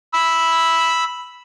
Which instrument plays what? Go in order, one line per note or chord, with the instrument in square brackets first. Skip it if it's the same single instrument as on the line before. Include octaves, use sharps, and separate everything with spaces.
[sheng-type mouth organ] B5 E6